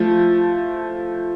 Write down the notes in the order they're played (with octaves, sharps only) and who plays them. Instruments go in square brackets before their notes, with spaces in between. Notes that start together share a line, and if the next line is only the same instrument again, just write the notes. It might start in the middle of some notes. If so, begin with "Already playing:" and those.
Already playing: [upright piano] F3 A3